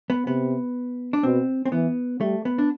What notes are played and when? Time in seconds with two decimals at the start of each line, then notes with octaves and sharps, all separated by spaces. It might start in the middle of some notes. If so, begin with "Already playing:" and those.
0.10 B3
0.27 C3 B3
1.13 D4
1.23 B2 C4
1.65 C4
1.72 E3 B3
2.21 G3 A3
2.45 B3
2.58 D4